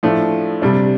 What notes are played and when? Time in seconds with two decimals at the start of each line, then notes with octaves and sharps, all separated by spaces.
0.03 A2 F3 A3 D4
0.62 C3 G3 D4